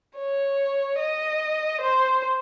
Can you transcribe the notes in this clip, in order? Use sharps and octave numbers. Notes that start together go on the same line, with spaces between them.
C#5
D#5
C5